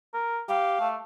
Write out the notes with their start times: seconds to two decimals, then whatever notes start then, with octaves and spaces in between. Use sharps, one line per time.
0.14 A#4
0.49 G4 F5
0.80 A3